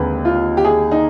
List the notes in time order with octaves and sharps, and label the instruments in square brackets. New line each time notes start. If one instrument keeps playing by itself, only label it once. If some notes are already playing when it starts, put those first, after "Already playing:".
Already playing: [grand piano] D#2 D3 G#3 C4 [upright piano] B4
[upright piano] F4
G4
G#4
D#4